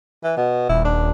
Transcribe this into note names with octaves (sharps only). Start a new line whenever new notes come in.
E3
B2
D#1 E4
D4